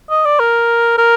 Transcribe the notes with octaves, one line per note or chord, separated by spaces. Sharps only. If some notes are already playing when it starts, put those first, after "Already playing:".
D#5
D5
A#4
A#4